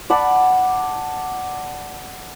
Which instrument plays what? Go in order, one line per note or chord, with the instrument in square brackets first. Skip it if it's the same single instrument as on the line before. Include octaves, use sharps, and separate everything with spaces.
[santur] D5 F#5 A5 B5